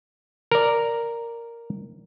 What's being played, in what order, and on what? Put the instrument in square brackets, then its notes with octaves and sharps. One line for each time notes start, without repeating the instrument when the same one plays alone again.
[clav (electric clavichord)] A#4 D5